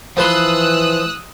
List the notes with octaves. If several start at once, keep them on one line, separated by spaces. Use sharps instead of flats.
E3 F3 B4 C6 D#6 E6 F#6